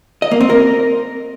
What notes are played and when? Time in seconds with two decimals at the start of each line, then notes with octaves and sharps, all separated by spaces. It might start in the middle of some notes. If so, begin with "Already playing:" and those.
0.22 D#5
0.31 A#3
0.41 C4
0.50 A#4